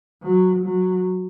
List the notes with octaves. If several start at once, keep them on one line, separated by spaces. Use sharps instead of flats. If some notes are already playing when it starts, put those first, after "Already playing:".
F#3
F#3